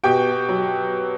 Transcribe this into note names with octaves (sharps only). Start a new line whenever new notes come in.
B2 G4 G5
F#3